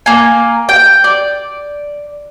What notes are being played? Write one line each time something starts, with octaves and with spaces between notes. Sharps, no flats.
A#3 G#5
G5
D5